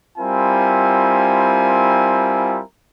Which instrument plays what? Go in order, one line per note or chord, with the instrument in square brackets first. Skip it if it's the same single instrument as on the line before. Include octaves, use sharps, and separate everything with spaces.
[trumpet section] G3 C4 E4 F4 A#4 G#5